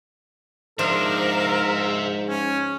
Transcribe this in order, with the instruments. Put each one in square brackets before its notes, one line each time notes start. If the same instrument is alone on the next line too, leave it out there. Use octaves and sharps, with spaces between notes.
[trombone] G#2 [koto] F3 D4 [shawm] A#4 [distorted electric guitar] C5 E5
[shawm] C#4